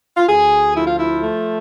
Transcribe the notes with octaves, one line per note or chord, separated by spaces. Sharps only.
F4
D2 G#4
F3 E4
F4
E4
A3